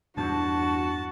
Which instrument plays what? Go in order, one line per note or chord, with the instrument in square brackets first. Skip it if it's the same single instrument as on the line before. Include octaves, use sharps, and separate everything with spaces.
[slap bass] E2 G2 [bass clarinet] D4 [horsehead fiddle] F#4 [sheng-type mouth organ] A5